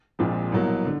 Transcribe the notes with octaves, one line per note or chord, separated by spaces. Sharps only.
A#1 A#2 F3 G#3 C4
C2 B2 F#3 A#3
D3